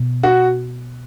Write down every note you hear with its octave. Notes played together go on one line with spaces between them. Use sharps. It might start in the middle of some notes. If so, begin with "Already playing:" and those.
Already playing: B2
F#4